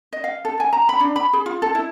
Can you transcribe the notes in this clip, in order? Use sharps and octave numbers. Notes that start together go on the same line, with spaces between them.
D#5
F5
A4
G#5
A#5
B5
D4
B5
G#4
F4
A4
E4